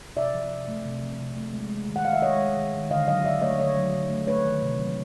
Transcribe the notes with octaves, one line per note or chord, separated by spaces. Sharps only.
C3 D5 E5
F3
C3
A3
C3
F3
C3
A3
G#3
G#3
D#3
F#5
D#3 F5
E5
G#3 C#5 D#5
G#3
D#3
D#3
D3 D#5 F5
F#3 D#5 F5
D3 D5 E5
A3 C#5 D#5
D3 C#5 D#5
F#3
D3
A3
A3 B4 C#5
D#3
C3
F#3